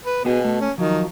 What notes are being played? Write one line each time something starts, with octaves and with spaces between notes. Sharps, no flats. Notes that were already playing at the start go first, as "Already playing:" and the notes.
B4
B2 B3 F#4 G#4
A3
C#4
D#3 F3 F#3